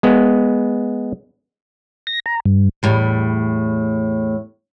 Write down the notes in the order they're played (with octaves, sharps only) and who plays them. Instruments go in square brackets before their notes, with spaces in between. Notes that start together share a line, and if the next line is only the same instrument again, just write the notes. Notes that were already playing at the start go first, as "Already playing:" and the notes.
[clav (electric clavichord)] G#3 B3
[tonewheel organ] A#6
A#5
G2
[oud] E2 A2 G3